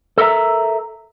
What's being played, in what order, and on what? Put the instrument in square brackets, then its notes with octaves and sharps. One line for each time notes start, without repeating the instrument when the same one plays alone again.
[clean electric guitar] A4 A#4 C#5 E5 A#5